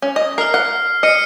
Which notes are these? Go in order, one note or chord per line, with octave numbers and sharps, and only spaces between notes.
C#4
D#5
A#4 F6 C7
F#5
D#5 F6 C#7 D#7